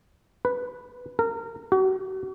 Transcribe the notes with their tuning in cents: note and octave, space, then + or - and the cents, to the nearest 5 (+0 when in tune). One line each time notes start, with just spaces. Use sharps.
B4 +0
A#4 -25
F#4 +35